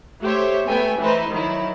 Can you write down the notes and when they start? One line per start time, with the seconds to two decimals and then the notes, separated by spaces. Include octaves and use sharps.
0.22 A3 G4 C5 C#5 E5
0.66 A3 B3 G5 G#5
0.98 E3 A3 D#4 B4 C5
1.29 D#3 F#3 E4